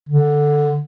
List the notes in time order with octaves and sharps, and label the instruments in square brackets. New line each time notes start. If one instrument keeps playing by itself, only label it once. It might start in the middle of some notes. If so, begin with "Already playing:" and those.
[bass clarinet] D3